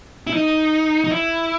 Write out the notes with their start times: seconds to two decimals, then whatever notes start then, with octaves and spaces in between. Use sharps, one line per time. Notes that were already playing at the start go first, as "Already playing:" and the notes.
0.27 E4
0.34 D#4
1.04 D#4
1.12 E4